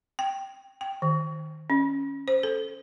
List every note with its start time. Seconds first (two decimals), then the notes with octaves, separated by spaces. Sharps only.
0.19 G5
0.81 G5
1.02 D#3
1.70 C#4
2.28 C5
2.43 A4